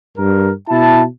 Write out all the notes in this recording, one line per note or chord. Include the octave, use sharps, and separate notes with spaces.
G2 A#4
B2 E4 A5